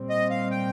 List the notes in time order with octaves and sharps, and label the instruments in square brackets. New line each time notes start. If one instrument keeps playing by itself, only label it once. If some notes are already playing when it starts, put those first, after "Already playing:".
Already playing: [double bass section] A#2 G3 C4
[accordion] D#5
F5
G5